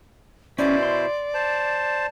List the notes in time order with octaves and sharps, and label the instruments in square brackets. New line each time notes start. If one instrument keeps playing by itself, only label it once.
[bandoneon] B2 E4 C5 [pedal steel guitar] C#4 [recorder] D5
[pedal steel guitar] C6
[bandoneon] C5 A5